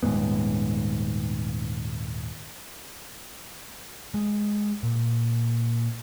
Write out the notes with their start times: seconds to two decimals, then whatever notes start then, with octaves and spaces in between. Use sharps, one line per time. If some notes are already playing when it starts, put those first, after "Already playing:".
0.03 D#1 F2 G#2 B3
4.14 G#3
4.83 A#2